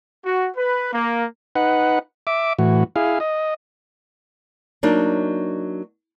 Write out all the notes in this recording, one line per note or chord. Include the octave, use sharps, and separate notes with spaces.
F#4
B4
A#3
D#4 B4 F#5
E5 D6
A2 E3 F#4
E4 G#4 F5
D#5
F#3 A#3 D4 D#4